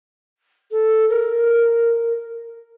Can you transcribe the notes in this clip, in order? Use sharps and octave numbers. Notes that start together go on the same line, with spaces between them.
A4
A#4